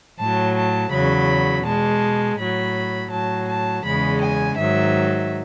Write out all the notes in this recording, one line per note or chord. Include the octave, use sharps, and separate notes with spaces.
A2 F#3 A5
A5
E2 C#3 F#3 B5
B2 G#3 A5
A2 F#3 B5
A2 F#3 A5
A5
E2 C#3 G#3 B5
G#5
G#2 D#3 F#3 E5